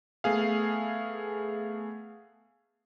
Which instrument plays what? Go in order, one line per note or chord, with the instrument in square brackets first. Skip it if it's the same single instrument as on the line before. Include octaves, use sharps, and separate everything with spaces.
[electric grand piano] A3 B3 G#4 F5